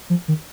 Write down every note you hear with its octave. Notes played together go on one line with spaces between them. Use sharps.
F3
D#3